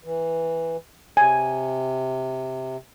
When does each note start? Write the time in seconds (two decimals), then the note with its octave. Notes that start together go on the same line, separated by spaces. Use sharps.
0.04 E3
1.17 C3 G#5